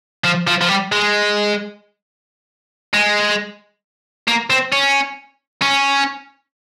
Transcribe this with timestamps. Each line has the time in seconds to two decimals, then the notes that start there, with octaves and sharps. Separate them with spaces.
0.24 F3
0.47 F3
0.61 F3
0.69 G3
0.92 G#3
2.93 G#3
4.28 A#3
4.50 C4
4.72 C#4
5.62 C#4